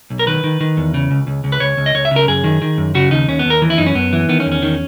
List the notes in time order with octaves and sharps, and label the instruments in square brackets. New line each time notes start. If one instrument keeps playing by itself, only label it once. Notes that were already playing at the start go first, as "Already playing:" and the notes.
[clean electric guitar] B1
A#4
D#3 B4
D#3
D#3
E2
C#3
C#2
C#2
C#2
B4
C#2 C#5
C#2
D#5
C#2 C#5
E5
C#3
A#4
F#2 G#4
D#3
D#3
F#2
C#3 F#4
D#2 D#4
D#2 C#4
B3
D#2
A#4
E3
E4
F#2 D#4
C#4
F#2 B3
E3
D#3 B3
C#4
E2
C#4
D#3